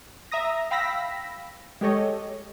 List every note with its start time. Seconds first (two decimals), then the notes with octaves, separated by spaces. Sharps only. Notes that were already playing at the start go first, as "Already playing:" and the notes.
0.31 E5 A#5 D#6 A#6
0.71 F5 G5 B5 E6 A#6 B6
1.81 G#3 G4 A4 C#5 D#5